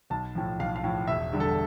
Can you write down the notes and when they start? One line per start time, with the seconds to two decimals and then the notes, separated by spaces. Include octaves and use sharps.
0.10 B1 A5
0.35 A2 F3
0.59 B1 F5
0.76 F5
0.84 A2 F3
1.07 E1 E5
1.32 E2 D3 G3
1.40 A4